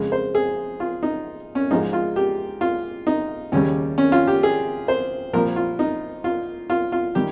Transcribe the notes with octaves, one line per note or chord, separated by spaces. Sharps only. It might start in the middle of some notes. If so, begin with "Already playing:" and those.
Already playing: F2 C#3 G#3
C5
G#4
F4
D#4
C#4
G#2 F3 G#3 D#4
F4
G4
F4
D#4
D#2 C#3 G3 C#4
C#4
F4
G4
G#4
C5
C2 A#2 F3 A#4
F4
D#4
F4
F4
F4
D#3 G3 G4